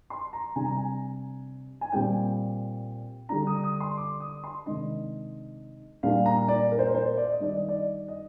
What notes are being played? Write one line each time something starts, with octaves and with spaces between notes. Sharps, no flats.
C6
A#5
C3 G3 D4 G#5
A#5
G#5
G#5
A#2 G3 C4 G5
D3 G3 D4 A#5
D#6
D#6
C6
D6
D#6
C6
C3 D#3 G#3 D4 D#5
A#2 G3 A#3 D4 F5
A#5
D5
A#4
C5
A#4
C5
D5
D#5
D#3 G3 D4 D5
D#5
D5
D#5